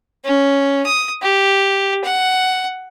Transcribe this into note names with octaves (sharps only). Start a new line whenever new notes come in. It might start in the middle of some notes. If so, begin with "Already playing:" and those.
C#4
D#6
G4
F#5